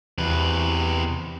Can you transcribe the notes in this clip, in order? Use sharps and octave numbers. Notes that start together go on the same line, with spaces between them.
E2 C3 B4